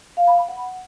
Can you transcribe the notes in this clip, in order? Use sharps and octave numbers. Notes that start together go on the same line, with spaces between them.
F5
B5
B5
F#5